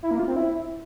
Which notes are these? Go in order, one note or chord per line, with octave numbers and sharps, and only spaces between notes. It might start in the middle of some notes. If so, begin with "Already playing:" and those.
E4
A#3
F4
C4
E4